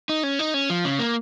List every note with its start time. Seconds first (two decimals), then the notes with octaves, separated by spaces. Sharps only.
0.09 D#4
0.23 C#4
0.39 D#4
0.54 C#4
0.70 F3
0.85 C#3
0.99 A#3